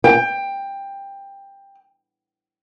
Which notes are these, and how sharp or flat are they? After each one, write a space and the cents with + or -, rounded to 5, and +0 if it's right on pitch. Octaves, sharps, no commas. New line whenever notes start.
G5 +15